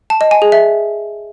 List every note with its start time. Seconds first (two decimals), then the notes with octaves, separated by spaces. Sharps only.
0.10 A5
0.21 D#5
0.31 G#5
0.42 G#4
0.52 E5